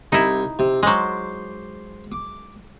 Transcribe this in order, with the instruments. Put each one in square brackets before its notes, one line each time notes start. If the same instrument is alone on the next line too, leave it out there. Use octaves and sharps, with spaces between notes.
[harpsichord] C2 [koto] D#4 E4
[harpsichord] C3
[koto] F#3 G#3 [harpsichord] C5 D6
[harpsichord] D6